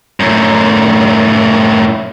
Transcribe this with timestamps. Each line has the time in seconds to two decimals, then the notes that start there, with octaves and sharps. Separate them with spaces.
0.20 F#2 A2